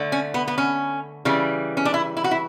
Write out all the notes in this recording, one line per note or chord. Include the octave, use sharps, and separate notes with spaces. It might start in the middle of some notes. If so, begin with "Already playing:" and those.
Already playing: D3 A3
C#4
B3
B3
C#4
C#3 E3 G3
C#4
D4
E4
E4
F#4
E4